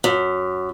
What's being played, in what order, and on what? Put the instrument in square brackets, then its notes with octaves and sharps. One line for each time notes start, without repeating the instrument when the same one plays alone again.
[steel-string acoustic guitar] F#2